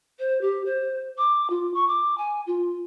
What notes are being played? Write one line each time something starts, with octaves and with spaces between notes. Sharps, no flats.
C5
G4
C5
D6
F4
C#6
D6
G#5
F4